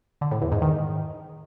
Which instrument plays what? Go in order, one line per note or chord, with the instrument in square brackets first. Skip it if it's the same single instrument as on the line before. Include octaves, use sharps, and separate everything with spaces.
[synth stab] D3
A2
E2
G#2
D#3